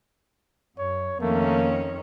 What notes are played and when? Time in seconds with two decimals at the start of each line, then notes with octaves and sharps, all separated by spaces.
0.78 F#2 C#5
1.20 F2 D#3 A3 A#3 C#4